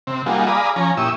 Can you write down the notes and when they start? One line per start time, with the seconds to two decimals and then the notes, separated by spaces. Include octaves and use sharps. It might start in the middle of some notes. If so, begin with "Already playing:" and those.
0.07 C3 C4
0.26 G3 A#3 D#4 F4 F#4 G#4
0.47 G#4 D5 F5 A#5 B5 D#6
0.76 F3 C#4 G#5 A#5
0.97 A#2 E4 G4 C#6 D#6 E6